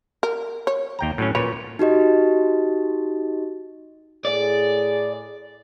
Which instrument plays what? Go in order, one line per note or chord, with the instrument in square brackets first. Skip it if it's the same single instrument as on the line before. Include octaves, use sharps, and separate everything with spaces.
[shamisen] A#4
C#5
[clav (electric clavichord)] D#2 G5 A#5
A2 F#3 C#4
[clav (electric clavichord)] A#2 C#5 [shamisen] B4
[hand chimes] D#4 F#4 G4 D#5
[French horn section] A2 G#4 [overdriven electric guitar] D5